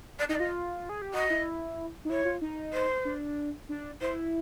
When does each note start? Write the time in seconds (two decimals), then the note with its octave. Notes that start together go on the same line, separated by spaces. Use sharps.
0.19 D5
0.29 D#4 D#5
0.35 D5
0.39 F4 D#5
0.89 G#4
1.02 G4
1.14 F#4 D#5
1.30 E4
2.05 D#4
2.10 E4 C#5
2.25 F4
2.41 D#4
2.73 C5
3.05 D4
3.69 D4
4.01 E4 C5